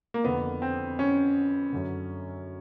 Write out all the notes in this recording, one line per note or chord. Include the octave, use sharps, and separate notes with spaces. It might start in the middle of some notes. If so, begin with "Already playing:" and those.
A#3
F2 D3 B3
C4
C#4
F#2 D3